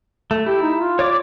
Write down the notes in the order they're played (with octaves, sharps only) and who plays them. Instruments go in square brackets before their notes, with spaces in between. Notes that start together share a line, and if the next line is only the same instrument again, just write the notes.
[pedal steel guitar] A3
[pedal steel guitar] E4 [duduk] G4
[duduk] D#4
F4
[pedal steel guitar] C#5 D5 D6